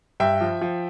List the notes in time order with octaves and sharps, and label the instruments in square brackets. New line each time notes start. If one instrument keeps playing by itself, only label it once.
[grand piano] G2 E5 G5
F3
F3